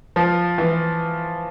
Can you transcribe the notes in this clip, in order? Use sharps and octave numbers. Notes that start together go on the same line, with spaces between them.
F3
E3